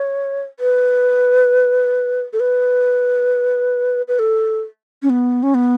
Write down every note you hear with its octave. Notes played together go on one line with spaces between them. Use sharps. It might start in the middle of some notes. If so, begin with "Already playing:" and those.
Already playing: C#5
B4
A4
B4
B4
A4
C#4
B3
C#4
B3